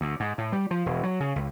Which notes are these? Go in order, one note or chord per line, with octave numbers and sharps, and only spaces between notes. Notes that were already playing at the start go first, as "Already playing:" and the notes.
D2
G#2
A2
G3
F3
E1
F#3
C#3
C#2